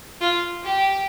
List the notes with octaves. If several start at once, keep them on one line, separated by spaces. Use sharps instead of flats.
F4
G4